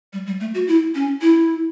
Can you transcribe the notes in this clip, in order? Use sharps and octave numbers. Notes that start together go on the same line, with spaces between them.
G3
G3
A3
F#4
E4
C#4
E4